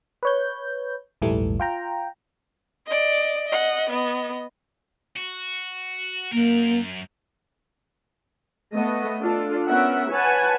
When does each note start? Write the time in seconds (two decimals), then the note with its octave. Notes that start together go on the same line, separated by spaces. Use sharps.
0.23 B4 C#5 G6
1.22 A#1 E2 G#2 E3 G3 A3
1.60 F4 G5 A#5
2.86 D5 D#5
3.48 D#5 F#5
3.90 B3 D#5
5.16 F#4
6.33 F#2 A#3 A#4
8.74 A3 B3 D#5
9.20 D4 F4 A4
9.67 B3 C#4 A#4 E5 F#5
10.11 B4 C#5 F#5 G#5 A5